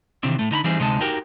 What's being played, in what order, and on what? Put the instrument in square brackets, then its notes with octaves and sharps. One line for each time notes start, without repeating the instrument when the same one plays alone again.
[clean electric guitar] C3 D#3 E3 C4 D4
A2 A3
D3 D#4 A#5 B5
E3 G3 C4 D#4 G#4
D2 C3 G#3 D#4 A5
D#4 F#4 G4 A#4